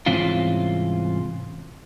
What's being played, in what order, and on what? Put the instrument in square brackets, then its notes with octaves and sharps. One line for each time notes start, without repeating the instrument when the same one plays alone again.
[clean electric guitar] C2 G#2 E3 C4 C#4 F4